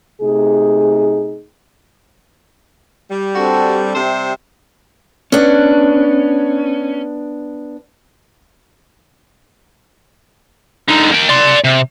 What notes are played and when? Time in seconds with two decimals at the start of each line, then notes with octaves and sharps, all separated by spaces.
0.22 C3 A3 D#4 G#4
3.10 G3
3.35 C4 D4 F#4 A4
3.95 C3 G3 C5 E5
5.32 B3 C#4 D4
10.88 D3 D#4
11.11 A#3 G5
11.29 D5 C6
11.64 C3